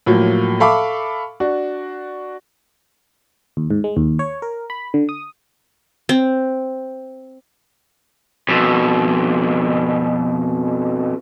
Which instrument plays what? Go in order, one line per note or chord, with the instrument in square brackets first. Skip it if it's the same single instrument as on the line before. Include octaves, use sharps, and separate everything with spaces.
[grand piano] A2 F3 F#3 A#3
A4 E5 F5 B5 C#6 D6
D4 F#4
[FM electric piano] D#2
G#2
G#3
D#2
C#5
A#4
B5
D3
D#6
[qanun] C4
[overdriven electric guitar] F2 B2